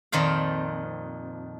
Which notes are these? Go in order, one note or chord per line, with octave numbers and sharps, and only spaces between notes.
F2 A#2 D#3 C5 F5